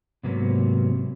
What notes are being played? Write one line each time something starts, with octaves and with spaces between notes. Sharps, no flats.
G#2 C3 F#3 A#3 B3 C#4